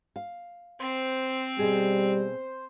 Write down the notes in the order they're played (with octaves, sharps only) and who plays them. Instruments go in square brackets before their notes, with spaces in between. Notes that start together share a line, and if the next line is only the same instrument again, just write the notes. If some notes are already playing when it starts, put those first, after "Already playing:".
[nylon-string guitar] F5
[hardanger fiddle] C4 [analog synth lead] C5
[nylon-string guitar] B2 G#4 [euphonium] G3